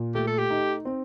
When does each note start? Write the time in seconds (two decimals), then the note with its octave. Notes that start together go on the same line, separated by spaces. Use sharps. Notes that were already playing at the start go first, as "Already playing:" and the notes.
Already playing: A#2
0.15 A3 G4
0.27 A4
0.39 G4
0.51 D#4
0.85 C4